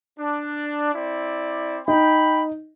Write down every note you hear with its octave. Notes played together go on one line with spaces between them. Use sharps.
D4
C4 E4 D5
D#4 G5 B5